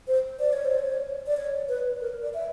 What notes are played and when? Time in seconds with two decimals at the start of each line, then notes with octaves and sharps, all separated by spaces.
0.07 C5
0.39 D5
0.53 C#5
0.65 C5
0.78 C#5
1.27 D5
1.37 C#5
1.69 B4
2.01 A#4
2.22 D5
2.34 E5